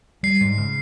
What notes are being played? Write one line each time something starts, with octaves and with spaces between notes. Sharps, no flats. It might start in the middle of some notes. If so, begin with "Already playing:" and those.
G3 C7
G#2
C#3